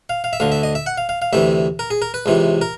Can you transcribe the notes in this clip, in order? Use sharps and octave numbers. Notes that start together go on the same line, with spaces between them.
F5
F5
E5
D2 D3 F5
E5
D#5
E5
F#5
F5
F5
F5
D2 C3 E3 E5
A#4
G#4
A#4
B4
C#2 C3 E3
A#4